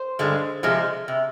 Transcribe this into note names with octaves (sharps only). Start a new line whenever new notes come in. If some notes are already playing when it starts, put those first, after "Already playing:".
Already playing: C5
G2 D3 G#3
C3 F3 G#3
C3